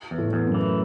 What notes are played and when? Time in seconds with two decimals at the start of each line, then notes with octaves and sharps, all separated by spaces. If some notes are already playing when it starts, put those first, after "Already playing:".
0.11 E2
0.18 A2 A3
0.33 E2
0.47 F#2 F#3
0.54 E3
0.66 A3